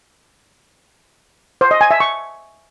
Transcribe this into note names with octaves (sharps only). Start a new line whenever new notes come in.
C5
D#5
G#5
E5
C#6